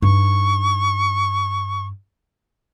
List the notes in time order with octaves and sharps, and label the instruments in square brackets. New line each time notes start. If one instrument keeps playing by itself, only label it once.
[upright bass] G2 D#4 [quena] C#6